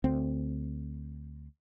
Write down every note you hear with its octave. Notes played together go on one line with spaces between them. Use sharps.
D2 C4